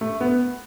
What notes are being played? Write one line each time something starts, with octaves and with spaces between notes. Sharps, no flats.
A3
B3